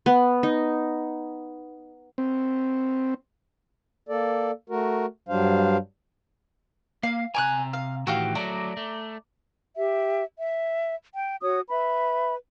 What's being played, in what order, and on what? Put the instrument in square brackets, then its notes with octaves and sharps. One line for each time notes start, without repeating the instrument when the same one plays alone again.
[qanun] B3
D#4
[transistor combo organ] C4
[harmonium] A#3 A4 D5
A3 F#4 A#4
G2 F#3 G3 D4 C5 F5
[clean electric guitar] A#3 [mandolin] F5
[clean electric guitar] C3 A#5 [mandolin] G#5 D6 F#6
[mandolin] F5
[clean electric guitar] A2 D#3 E3 [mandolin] F#4 G4 F5
[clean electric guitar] F#3 A3 [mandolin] D5 A#5
[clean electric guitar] A3
[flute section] G4 E5
E5
G5
F#4 C#5 D#6
B4 E5 B5